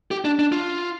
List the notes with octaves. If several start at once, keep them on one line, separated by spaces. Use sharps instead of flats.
G4
D4
D4
F4